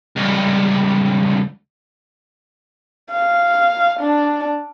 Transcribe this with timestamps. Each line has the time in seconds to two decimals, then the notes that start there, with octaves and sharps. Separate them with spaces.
0.16 C#2 G2
3.12 F5
4.00 D4